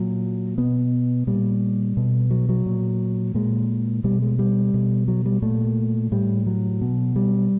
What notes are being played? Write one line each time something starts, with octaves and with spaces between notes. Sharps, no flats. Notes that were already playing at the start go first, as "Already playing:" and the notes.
Already playing: A#2 F#3
B2 B3
A#2 G3
B2
F#3
F#3
A#2
A#2 G#3
B2 G3
G#3
G3
B2
F#3
G3
A#2 A3
A2 G3
F#3
B2
G3